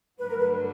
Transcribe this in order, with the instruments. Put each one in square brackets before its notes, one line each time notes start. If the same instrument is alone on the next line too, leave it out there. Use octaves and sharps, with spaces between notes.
[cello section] G2 D3 F#3 A3 [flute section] B4
[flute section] A#4
B4